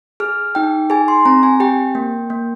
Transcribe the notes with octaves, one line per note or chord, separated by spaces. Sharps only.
G#4 F6
D#4 G5
G#4 G#5
C6
C4 A#5
G#5
G4 G5
A#3
A#3